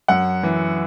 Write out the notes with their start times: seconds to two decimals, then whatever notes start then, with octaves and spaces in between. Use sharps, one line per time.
0.08 F#2 F#5
0.43 E3